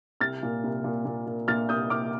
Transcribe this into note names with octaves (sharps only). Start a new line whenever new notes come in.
C2 F6 A6
A#2
C2
A#2
A#2
A#2
A#2 F6 A6
C2 D#6 G6
C2 D6 F6